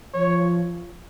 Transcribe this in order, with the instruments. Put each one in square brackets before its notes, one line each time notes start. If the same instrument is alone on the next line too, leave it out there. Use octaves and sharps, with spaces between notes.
[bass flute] F3 [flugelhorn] C#5